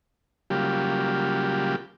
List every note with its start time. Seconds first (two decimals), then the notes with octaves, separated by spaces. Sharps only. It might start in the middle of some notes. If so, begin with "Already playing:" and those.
0.50 C#3 F#3 G3 A#3 F4 G4